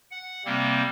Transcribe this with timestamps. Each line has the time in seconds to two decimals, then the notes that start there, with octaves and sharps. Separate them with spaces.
0.11 F#5
0.45 C3 G3 A#3 C4